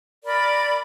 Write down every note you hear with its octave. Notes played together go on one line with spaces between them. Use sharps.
A#4 D5 B5